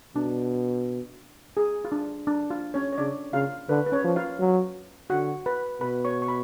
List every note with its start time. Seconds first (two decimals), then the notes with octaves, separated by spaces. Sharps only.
0.16 B2 D4
1.57 G#4
1.85 F4
1.92 D4
2.27 D4
2.51 F4
2.74 C#4 C#5
2.93 C#5
2.98 C#3 D4 D5
3.33 C#3 F4 F5
3.69 D3 B4
3.86 B4
3.92 C#4 C#5
4.04 F3
4.16 F4 F5
4.40 F#3
5.10 D3 F#4 F#5
5.46 B4 B5
5.81 B2 B4 B5
6.05 C#5 C#6
6.22 C#6
6.28 B5